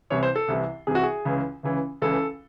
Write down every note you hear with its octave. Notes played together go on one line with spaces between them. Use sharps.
C2 C3 E3 C#5
C5
A4
C2 C3 E3
C2 C3 E3 G#4
F#4
G#4
C#2 C#3 E3
C#2 C#3 E3
C#2 C#3 E3 A4